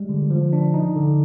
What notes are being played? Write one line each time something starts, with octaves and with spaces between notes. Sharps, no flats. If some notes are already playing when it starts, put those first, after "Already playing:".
Already playing: G3 G#3
D3
F3
D4
D#4
D3